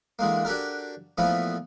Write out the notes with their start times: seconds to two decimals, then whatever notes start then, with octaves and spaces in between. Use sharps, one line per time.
0.19 D3 E3 G#3 A#3
0.45 D4 F#4 G4 A4 A#4
1.18 A#2 E3 F3 A3 B3